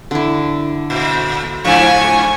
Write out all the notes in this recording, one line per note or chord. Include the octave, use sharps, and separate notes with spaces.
D3 E4
A#2
G#2 F3 D4 G#5 C#6